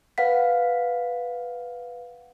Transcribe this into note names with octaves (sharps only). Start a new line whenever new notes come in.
B4 F5 F#5 B6